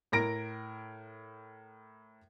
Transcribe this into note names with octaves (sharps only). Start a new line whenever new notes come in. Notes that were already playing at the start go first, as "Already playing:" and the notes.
A2 A#4 A#6 D7